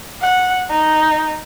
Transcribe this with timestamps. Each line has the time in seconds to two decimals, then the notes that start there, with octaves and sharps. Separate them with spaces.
0.21 F#5
0.70 D#4